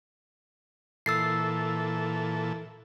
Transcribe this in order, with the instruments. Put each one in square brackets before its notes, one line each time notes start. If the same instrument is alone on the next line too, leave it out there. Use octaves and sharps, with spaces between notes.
[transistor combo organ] A#2 E3 A4 [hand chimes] E6 A6 C7